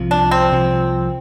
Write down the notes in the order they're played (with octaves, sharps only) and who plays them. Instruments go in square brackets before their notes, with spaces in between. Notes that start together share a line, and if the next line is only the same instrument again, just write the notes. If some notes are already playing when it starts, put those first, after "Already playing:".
Already playing: [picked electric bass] C2 C3 F3
[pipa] D4
C4
[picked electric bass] C2 C3 F3